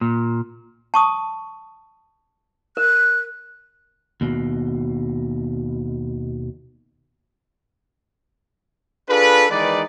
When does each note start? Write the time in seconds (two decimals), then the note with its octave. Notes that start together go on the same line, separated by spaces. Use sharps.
0.01 A#2
0.94 A5 C#6 D#6
2.77 A#4 F#6
4.21 D#2 B2
9.09 D4 F4 G#4 A4 B4
9.50 D#3 E3 G#3 D#4 B4 D5